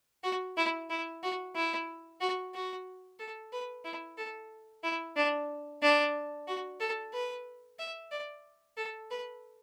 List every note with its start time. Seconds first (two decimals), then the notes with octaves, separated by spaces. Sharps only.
0.24 F#4
0.57 E4
0.90 E4
1.23 F#4
1.55 E4
2.21 F#4
2.54 F#4
3.19 A4
3.53 B4
3.85 E4
4.18 A4
4.84 E4
5.16 D4
5.82 D4
6.48 F#4
6.80 A4
7.14 B4
7.79 E5
8.11 D5
8.77 A4
9.11 B4